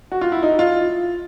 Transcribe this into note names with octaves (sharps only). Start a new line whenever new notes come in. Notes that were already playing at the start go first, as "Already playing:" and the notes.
F#4
F4
E4
D#4
F4